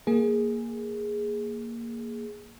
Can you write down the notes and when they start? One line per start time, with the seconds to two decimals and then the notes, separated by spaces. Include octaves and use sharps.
0.07 A#3 G#4